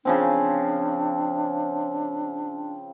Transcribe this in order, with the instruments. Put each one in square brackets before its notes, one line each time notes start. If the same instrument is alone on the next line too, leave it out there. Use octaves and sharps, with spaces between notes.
[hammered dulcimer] C#3 F3 C4 [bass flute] D4